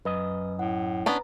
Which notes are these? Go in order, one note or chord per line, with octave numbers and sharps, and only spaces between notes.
F#2 B4 D#5
A2 F#5
B3 C#4 D4 B4 A#5